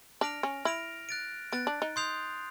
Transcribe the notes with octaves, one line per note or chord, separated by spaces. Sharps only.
D4 F6 A#6 D7 F7
C#4
E4 F6 A#6 D7 F7
F#6 A6 D7
B3 F#6 A6 D7
D4
D#4
C6 D#6 G6 C7 F7